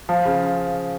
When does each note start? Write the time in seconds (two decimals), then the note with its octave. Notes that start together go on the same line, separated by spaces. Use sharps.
0.09 F3
0.25 C#3